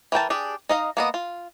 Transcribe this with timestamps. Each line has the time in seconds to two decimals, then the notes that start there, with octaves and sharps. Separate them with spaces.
0.12 E3 A#4 G5 A5
0.30 D4 G4 G#4
0.69 D#4 D#5 F5
0.97 A#3 B3 D#5
1.14 F4